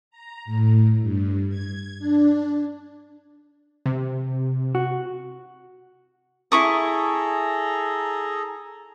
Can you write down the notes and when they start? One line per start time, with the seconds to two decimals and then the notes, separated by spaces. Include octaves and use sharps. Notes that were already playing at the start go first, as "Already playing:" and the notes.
0.11 A#5
0.45 A2
1.01 G2
1.49 G#6
1.99 D4
3.86 C3
4.75 F#4
6.52 E4 G#4 A4 A#5 C#6 D#6